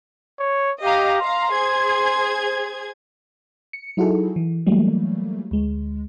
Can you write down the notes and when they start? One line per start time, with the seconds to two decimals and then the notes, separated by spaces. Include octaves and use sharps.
0.39 C#5
0.83 G4 D#5 F5 A#5
1.21 F5 A#5 C6
1.52 G#4 C5 G#6
3.73 C#7
3.97 F#3 D#4 E4 F#4 G#4 A4
4.36 E3
4.66 E3 F#3 G3 A3 A#3
5.51 D2 G#3